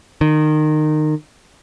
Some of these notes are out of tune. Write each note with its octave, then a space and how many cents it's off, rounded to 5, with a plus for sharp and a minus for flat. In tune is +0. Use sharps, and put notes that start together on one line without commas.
D#3 -25